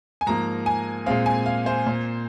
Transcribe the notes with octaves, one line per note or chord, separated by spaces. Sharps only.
G#5
G#2 F3 A#3 A#5
G#5
A#2 G#3 C4 F5
G#5
F5
C5
A#2 A#3